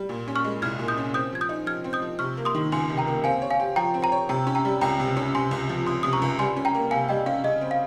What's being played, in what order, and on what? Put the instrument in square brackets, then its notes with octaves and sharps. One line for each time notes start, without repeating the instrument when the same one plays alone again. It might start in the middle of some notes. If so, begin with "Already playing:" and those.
Already playing: [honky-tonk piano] G3
A#2
C#4
[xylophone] C#6 F6
[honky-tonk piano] G#3
[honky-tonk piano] C2 [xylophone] F6 G#6
[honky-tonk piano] A#2
[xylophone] D#6 G6
[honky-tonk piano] C#4
[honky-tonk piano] C4 [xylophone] D#6 G6
[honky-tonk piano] F3 [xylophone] G#6
[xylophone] D#6 G6
[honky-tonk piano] D#4
[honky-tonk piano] F3 [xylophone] F6 G#6
[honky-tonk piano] C4
[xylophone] D#6 G6
[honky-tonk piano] F3
[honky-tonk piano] C3 [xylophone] C#6 F6
[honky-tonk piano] A#3
[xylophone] C6 D#6
[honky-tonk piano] D#3
[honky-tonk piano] C#2 [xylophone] G#5 C6
[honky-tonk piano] C3
[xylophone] G5 A#5
[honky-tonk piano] A#3
[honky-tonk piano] C4 [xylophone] F5 G#5
[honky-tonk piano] C#5
[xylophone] F5 G#5
[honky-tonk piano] G4
[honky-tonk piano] F3 [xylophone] G5 A#5
[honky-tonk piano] C4
[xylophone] G5 A#5
[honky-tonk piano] C#5
[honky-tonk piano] C3 [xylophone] G5 A#5
[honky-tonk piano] C#4
[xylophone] G5 A#5
[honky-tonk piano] G3
[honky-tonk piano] C#2 [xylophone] G5 A#5
[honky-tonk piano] C3
C#4
[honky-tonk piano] C3 [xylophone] G#5 C6
[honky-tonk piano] C#2
F3
[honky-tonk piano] C#2 [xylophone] C6 D#6
[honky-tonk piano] C3 [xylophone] D#6
[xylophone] A#5 C#6
[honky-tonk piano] C#2
[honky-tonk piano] G3 [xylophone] G#5 C6
[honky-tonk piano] C#4
[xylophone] G5 A#5
[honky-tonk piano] A#3
[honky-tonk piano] C3 [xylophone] F5 G#5
[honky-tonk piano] G3 [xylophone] D#5 G5
[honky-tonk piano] C#4 [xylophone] F5
[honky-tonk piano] C#3 [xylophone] D#5
[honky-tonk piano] C4
[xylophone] F5